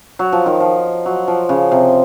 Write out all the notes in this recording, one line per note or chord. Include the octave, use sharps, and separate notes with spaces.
F#3
F3
D#3
F3
F#3
F3
C#3
C3